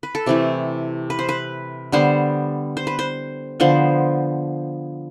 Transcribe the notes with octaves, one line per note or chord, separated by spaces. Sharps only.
B4
A4
C3 E3 A3 G4
B4
C5
B4
D3 G3 B3 C5
C5
B4
C5
D3 F3 B3 C5